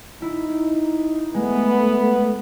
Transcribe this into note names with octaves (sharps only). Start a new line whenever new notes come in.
D#4 E4
G#3 A3 B3